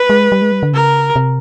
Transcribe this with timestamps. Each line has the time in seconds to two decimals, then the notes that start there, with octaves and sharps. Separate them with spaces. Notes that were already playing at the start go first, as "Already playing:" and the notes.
Already playing: B4
0.10 G#3
0.32 G3
0.42 G#3
0.52 G3
0.63 D3
0.73 C#3 A#4
1.16 C3